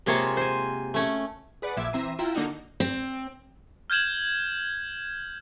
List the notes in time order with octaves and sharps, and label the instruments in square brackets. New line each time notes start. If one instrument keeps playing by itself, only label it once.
[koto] C3 G#3 A#3 F4 C#5 A5
C5 G#5
A3 C#4
[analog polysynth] G#4 B4 D5 F#5
A#1 A#2 F3 E5 D6 G#6
E3 C4 E5 A#5 C7 D#7
E4 F4 G5 A#5 E6
D3 A#3 D4 D#4 F#4
[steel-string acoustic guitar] C4
[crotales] F6 G6 G#6 E7 F#7